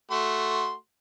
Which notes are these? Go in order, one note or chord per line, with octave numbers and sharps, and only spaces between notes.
A3 F#4 C6